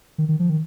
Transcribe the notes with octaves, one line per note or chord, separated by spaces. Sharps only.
D#3
D#3
F3
D#3